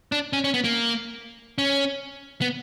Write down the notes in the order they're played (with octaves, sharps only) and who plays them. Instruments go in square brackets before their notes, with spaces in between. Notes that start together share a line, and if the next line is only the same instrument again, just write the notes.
[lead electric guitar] D4
C#4
C#4
B3
A#3
C#4
B3